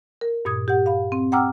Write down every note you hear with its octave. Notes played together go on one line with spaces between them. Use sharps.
A#4
G2 A#2 D#6 G#6
G4 F#5
F5 B5
C4
F#5 G5 A#5 D6 E6 F6